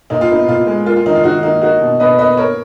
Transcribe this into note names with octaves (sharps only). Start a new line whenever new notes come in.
A#2 D#4
F4
B3 D#4
A#2 F4
G#3
A#3 F4
F4
D#3 D#4
F4
D#3 D#4 F#4
A#3 D#4
A#3 D#4 F#4
B2
B2 B4 D#5
A#3 B4 D#5
A#3 A#4 C#5